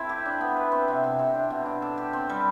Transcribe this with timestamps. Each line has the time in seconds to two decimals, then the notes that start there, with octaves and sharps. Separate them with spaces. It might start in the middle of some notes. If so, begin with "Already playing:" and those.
Already playing: C4 E4 A4
0.09 G4
0.26 D4
0.41 B3
0.56 B4
0.72 C4
0.88 C3
1.04 C3
1.19 C3
1.35 D4
1.50 B2
1.66 D4
1.82 A4
1.98 G4
2.13 C4
2.29 G3